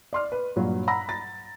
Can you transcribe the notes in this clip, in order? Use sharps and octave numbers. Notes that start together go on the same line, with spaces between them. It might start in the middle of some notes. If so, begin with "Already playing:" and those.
D5 C6 F6
B4
G2 A#2 F#3
F#5 A#5 B5 E6 A#6
A6